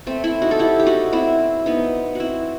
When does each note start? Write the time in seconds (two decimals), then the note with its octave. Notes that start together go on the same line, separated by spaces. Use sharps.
0.07 A3 C4
0.24 C4 E4
0.42 D#4 F#4
0.51 A4
0.59 E4 G4
0.80 G4
0.86 D#4 F#4
1.13 C4 E4
1.66 B3 D#4
2.15 C4 E4 F#4